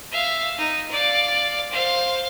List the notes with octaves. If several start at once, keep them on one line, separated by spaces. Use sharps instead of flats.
E5 F5
D#4
D5 F5
C5 F5